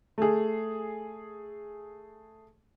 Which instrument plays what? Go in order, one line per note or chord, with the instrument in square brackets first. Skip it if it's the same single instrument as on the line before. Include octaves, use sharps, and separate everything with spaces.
[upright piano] A3 G#4